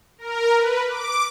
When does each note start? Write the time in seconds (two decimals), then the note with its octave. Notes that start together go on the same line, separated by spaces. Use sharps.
0.18 A#4
0.57 B4
0.88 D6